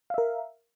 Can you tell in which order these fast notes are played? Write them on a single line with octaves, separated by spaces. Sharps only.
F5 E5 A#4